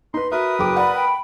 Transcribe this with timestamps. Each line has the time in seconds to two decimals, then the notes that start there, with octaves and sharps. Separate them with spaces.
0.14 D#4 B4 C6
0.32 F#4 A#4 B4 E5 D#6
0.59 F#1 F#4 G5 D6
0.77 D5 F#5 B5
0.95 G5